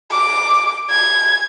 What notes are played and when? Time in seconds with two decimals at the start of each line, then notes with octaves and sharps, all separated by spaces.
0.12 D6
0.90 G#6